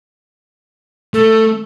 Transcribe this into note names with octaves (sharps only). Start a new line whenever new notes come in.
A3 A4